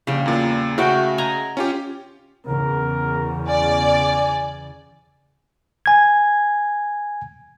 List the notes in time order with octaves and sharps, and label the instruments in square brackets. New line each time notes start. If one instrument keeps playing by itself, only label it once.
[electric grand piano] A#1 [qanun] C#3 G3
[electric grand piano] E2 A#2
[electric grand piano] C#3 [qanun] A3 F#4 G5
[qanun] D#5 G#5 A#5
[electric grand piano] C#4 F4 G4
[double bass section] E2 C#3 [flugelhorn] A#4
[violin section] D5 [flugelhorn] G#5
[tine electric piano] G#5 G#6